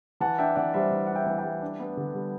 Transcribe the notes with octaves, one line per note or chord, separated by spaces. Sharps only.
E3 F#5 A5
D4 E5 G5
E3 D5 F#5
G3 C5 E5
E3
D4 F#5
E5 G5
E3
E5 G5
G3
D4
B3
D3
G3